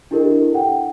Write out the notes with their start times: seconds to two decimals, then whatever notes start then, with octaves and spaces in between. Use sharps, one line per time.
0.11 D4 E4 G4 A4 A#4 D#5
0.54 F#5 G5